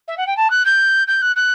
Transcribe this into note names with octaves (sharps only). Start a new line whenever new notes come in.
E5
F#5
G5
A5
F#6
G6
G6
F#6
F#6